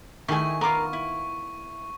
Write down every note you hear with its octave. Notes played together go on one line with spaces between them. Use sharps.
D#3 A3 E4 G#4 G#5 C#6
B3 F4 A#4 D6
E4